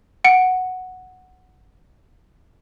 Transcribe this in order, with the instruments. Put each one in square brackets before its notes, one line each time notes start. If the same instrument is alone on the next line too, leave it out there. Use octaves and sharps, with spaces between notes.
[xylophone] F#5 C#7 D7